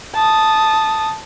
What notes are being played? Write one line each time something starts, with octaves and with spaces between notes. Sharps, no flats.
A5 D#6